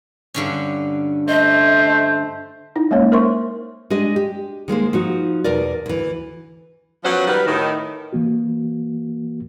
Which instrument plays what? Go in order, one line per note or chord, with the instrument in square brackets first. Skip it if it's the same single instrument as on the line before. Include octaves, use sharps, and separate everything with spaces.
[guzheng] G2 D3 C#4
[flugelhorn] A3 [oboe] C5 [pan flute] D#5
[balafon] D#4 E4
G#3 A#3 C#4 C#5
A#4 C5 E5 C6 C#6
[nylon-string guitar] G#3 D4 G4 D#5
G4
D#3 G#3 A#3 C5
F3 D#4 F#4
E2 B2 A#4 D5
D2 E3
[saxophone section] F3 F#3 B3 C#4 C5 F#5
D#3 G3 A#4 B4
A2 D#3
[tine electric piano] E3 A#3 F#4